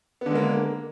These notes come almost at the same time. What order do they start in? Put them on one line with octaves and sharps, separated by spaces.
B3 D3 G#3 A#3